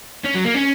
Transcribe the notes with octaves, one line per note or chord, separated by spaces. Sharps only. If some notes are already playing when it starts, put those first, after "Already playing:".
C#4
F#3
A#3
C#4